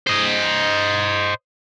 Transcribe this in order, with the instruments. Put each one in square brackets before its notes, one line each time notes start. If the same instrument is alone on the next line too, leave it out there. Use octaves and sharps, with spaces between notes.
[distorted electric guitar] C5 D#5